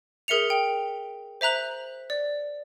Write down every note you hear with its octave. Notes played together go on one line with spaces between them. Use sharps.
G#4 A#4 E5 C#7 F7
G5
C5 E5 A#5 F#6 F#7
D5